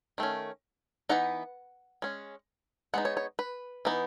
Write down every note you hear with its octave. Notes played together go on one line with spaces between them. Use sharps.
D#3 A3 C#4
E3 B3 D#4 F#5
G#3 C#4
G#3 B3 D#4 F#5
C#5
C#5
B4
E3 B3 D#4